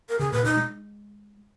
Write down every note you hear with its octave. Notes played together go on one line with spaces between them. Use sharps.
A#4
C#3 G#4
A#2 B4
B2 D#4
G#3